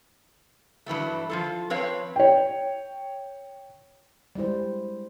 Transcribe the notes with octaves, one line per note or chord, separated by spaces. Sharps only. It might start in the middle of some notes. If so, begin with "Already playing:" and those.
G2 E3 F#3 A3
F3 F4 A4
F3 C4 B4 C#5 F5
C#5 G5
G3 G#3 E4 C5